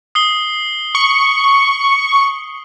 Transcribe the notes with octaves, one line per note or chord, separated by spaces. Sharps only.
D#6 C7 G7
C#6